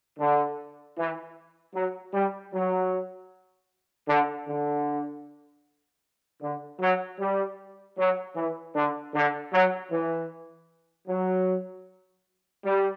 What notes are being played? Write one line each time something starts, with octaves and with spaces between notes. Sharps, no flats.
D3
E3
F#3
G3
F#3
D3
D3
D3
F#3
G3
F#3
E3
D3
D3
F#3
E3
F#3
G3